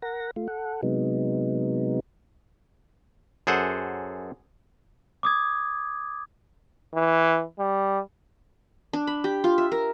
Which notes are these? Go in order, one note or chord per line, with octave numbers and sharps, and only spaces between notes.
A#4 F#5 A#6
A3 F4
A4 F#5
C3 F#3 G#3 B3 D#4
F#2 G#4 A4 C5 F#5
D6 D#6 G#6
E3
G3
D4
B5
G4
F4
E5
A#4